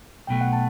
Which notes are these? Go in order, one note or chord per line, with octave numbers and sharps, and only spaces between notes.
B1 B2 A3 G5
F#5
A5